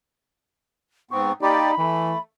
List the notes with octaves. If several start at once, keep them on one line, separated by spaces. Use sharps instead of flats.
G#2 B3 C4 C#6
A#3 D#4 G4 D5 B5
E3 A3